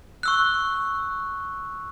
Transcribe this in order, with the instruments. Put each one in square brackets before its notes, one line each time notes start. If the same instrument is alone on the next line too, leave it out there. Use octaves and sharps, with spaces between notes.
[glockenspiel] C#6 E6 F#6